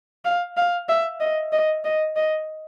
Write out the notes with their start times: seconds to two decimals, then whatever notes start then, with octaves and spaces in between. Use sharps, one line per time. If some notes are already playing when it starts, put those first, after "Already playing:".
0.25 F5
0.57 F5
0.89 E5
1.20 D#5
1.52 D#5
1.84 D#5
2.16 D#5